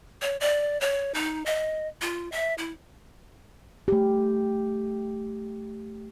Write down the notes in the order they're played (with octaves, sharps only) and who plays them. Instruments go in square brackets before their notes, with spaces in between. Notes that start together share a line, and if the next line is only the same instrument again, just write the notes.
[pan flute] C#5
D5
C#5
D#4
D#5
F4
E5
E4
[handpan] A3 G4